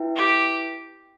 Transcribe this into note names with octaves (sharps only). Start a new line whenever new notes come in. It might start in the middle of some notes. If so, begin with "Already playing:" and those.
Already playing: E4 B4 E5 G5
G4